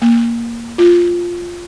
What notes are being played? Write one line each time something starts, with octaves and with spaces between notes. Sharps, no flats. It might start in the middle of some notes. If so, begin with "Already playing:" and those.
A#3
F4